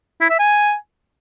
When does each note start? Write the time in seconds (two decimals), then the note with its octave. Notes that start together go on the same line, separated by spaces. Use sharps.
0.21 E4
0.30 E5
0.39 G#5